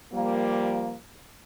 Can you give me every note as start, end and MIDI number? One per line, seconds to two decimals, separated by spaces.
0.13 0.95 53
0.13 0.95 55
0.13 0.95 58